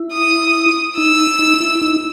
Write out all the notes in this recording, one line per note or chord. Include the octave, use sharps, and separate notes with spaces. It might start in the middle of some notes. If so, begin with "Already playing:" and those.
Already playing: E4
D#6
D#4 E6
D#4
E4
D#4